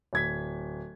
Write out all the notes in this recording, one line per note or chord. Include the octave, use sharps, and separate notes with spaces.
D1 G#6 B6